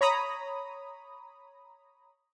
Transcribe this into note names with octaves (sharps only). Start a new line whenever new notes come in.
C#5 A#5 B5 D#6